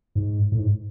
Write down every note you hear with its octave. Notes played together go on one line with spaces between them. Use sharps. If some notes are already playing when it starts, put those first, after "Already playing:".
G#2
A2
G#2